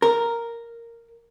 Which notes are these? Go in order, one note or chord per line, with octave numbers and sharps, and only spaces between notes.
A#4